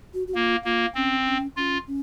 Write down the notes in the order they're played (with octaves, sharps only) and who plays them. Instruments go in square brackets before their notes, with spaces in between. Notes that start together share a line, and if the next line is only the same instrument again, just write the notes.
[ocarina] F#4
F#4
[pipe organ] A#3 [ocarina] F4
[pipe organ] A#3 [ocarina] F4
[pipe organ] C4 [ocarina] C#4
[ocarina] C#4
[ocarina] C#4 [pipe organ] F4
[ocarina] C#4